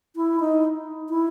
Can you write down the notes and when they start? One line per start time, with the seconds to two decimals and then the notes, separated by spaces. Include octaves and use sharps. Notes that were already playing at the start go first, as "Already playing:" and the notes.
0.16 E4
0.40 D#4
1.09 E4